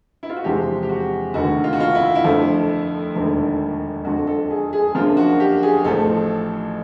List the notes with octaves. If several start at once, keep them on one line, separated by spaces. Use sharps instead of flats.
E4
F4
F#4
E2 C3 F3 G#3 C4 G4
G4
F#4
F1 D#2 D3 F#4
F4
F#4
F4
E4
E4
F2 D3 F3 A3
E1 D#2 D3 F3 A3
F2 D3 F3 F#4
A4
G#4
G#4
F#2 D3 F3 A#3 D4 F4
F#4
G4
G#4
A1 A2 F3 A3 A4